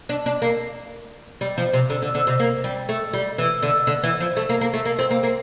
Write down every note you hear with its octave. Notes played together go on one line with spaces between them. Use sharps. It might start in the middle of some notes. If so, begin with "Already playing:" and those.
D4
D4
A#3
G3
F3
C3
D3
D3
D3
C3
A#3
G3
A3
G3
E3
D3
D3
E3
F3
A3
A#3
A#3
A3
A#3
C4
A#3
A#3